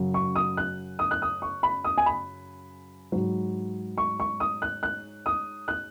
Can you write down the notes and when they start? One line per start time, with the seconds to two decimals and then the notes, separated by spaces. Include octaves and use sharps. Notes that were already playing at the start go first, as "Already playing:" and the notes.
Already playing: F#2 C#3 F#3
0.14 C#6
0.36 D#6
0.57 F#6
0.99 D#6
1.11 F#6
1.22 D#6
1.42 C#6
1.63 B5
1.84 D#6
1.98 G#5
2.06 B5
3.12 G#2 F#3
3.98 C#6
4.20 C#6
4.40 D#6
4.62 F#6
4.83 F#6
5.26 D#6
5.68 F#6